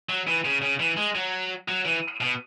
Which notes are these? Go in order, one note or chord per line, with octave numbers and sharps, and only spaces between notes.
F#3
E3
C#3
C#3
E3
G#3
F#3
F#3
E3
B2